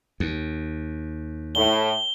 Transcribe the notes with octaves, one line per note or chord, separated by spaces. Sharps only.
D#2
A2 G7